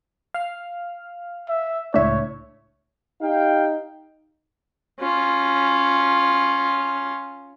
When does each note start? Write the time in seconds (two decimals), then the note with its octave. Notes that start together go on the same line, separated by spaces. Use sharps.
0.34 F5 F6
1.49 E5
1.94 C#2 A2 D4 C#5 E5
3.22 D#4 G4 F5 G5
5.00 C#4 F4